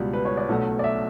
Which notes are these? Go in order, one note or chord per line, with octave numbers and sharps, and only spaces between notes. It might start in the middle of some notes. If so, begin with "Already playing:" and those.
Already playing: C#2 B2 G3
B4
C#5
D5
B1 B2 F#3 A3
D5
E5